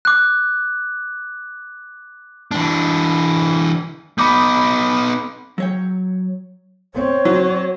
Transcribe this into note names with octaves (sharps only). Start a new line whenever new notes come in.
D6 F#6
E3 D4
B3 D#4 B5 D6 G6
F#3 C#5 G5
C4 C#5
F#3